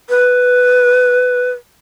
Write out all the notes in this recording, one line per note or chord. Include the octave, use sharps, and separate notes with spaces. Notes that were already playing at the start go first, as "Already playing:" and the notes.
B4